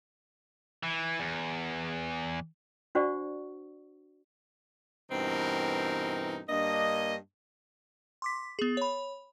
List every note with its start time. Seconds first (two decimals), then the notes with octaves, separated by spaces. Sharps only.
0.83 E3
1.20 E2
2.95 D4 F#4 C5 D5 F#5 C#6
5.11 G2 B2 E3 C4 D#4 A#4
6.49 G2 A#3 D4 D#5
8.22 C6 D6 B6
8.59 B3 G#4
8.77 C#5 B5